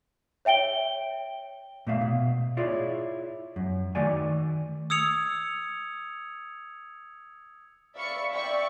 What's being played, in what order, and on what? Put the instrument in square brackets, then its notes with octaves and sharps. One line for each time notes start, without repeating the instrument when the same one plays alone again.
[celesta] C#5 E5 G5 D7 G7
[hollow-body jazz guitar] A#2 A3 E5 F5
B2
E4 F4 G#4 C#5 D5
F#2
D#3 A3 F#4 D5 G#5
[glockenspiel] D#6 E6 G#6 C#7 F7
[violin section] D5 E5 F5 B5 C#6 C#7
D5 E5 F5 G5 C#6